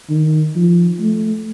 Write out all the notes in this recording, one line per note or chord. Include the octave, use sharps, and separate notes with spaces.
D#3
F3
A3